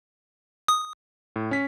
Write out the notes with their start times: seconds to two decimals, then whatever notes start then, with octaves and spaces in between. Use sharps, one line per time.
0.68 D#6
1.36 A2
1.51 C#4 B6